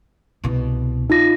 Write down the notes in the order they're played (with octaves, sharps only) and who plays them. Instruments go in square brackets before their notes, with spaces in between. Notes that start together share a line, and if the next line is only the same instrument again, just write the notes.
[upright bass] C2 B2
[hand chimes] D#4 F4 A#6